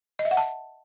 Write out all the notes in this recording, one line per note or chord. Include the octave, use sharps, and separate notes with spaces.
D#5
E5
F#5
A5